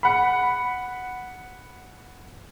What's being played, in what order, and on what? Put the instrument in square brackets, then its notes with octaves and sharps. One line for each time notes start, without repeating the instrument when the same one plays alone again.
[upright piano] F#5 B5